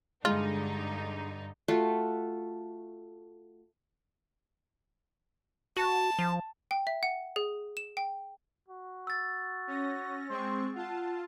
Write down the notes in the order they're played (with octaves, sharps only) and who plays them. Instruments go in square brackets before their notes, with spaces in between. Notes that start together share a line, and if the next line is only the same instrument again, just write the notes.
[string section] G2 D3 D#4 [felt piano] G#3 [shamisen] F4
[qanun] A3 F4 F#4
[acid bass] F#4 [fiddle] A5
[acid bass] F3
[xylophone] G5
E5
F#5
G#4
E7
G5
[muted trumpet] F#4
[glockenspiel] E6 A6
[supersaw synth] C#4 A#6
[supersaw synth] G#3 C4 C#6 [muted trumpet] C5
[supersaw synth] F4 A5 [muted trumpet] F#5